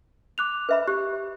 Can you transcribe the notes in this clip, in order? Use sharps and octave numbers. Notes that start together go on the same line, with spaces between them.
D6 F#6 F7
B4 E5 B5
G4 C#6 F#6